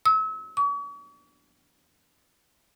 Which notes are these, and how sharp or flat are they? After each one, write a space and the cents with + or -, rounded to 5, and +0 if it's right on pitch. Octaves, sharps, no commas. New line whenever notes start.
E6 -35
C#6 +40